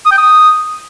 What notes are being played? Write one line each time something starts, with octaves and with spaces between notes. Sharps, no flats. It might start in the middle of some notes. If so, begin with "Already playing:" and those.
D#6
G5
D#6